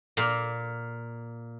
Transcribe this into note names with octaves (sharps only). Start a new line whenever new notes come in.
A#2 A#3